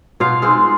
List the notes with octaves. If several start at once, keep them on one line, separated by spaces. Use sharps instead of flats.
B2 F4 F5
G#3 C4 D#4 F4 F5